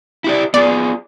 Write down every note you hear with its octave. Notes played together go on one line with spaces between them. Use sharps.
E4 G4 D5
B3 F4 G#4 D5